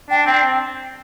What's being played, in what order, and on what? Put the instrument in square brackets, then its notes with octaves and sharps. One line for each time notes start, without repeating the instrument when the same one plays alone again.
[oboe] D4 [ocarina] G5
[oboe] C4 [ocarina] G5